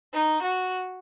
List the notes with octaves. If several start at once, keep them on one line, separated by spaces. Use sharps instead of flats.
D#4
F#4